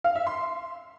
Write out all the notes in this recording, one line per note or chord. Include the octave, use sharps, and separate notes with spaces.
F5
E5
C6